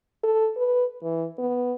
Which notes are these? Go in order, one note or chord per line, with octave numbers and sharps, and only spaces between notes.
A4
B4
E3
B3